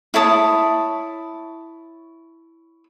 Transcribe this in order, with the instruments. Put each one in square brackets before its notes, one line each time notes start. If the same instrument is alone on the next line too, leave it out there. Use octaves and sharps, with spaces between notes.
[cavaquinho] E4 C#5 A5 D#6